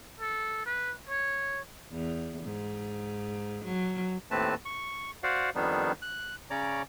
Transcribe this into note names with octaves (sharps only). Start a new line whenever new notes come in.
A4
B4
C#5
E2
G#2
F#3
D#2 A2 A3 C4 B4 A5
C#6
F#4 C5 D5 F5 F#5
F2 D#3 G3 B3 D4 D#4
F#6
C#3 C#4 C#5 D5 A#5 D6